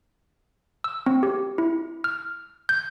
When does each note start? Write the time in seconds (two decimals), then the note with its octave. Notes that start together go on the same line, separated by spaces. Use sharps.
0.84 E6
1.06 C4
1.23 G4
1.58 E4
2.04 F6
2.69 G6